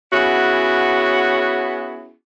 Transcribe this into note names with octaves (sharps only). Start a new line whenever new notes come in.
B3 C#4 E4 F#4 G#4 C#5